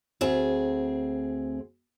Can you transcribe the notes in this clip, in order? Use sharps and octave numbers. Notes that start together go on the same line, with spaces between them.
D2 C4 G#4